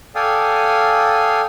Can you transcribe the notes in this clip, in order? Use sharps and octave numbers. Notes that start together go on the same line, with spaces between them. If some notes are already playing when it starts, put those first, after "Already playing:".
A4 D5 F5 G5 G#5 D#6